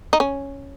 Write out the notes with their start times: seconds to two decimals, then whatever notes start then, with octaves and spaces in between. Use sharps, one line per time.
0.13 D#4
0.20 C#4